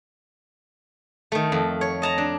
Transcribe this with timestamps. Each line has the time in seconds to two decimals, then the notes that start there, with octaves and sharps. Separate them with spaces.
1.32 D#3 A3
1.52 F2
1.81 C#5
2.02 D#5 A5 A#5
2.18 D4